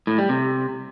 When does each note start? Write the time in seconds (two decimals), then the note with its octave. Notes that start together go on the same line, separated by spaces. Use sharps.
0.07 A2
0.18 G3
0.29 C3